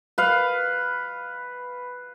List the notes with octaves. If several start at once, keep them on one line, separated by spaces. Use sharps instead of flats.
B4 F5